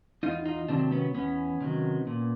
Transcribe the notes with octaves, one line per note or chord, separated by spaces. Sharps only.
E2 D#4 F4
D#4 F4
C3 D#3 F#3 C4 D4
B3 C#4
E2 B3 C#4
C3 D#3 F#3
A#2